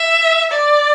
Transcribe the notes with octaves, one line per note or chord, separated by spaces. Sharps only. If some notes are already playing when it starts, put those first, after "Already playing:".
Already playing: E5
D5